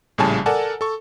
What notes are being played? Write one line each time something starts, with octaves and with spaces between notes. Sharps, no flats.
A#1 A2 C#3 G3 G#5 A5
A4 A#4 D5 F#5 G#5 A5
A4 C#6